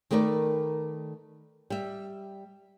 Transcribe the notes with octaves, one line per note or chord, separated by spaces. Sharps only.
D#3 A3 A#4 B4 D5
G3 E5